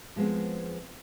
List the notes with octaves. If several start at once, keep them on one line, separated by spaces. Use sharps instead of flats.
F3 G#3 B3 C4 G#4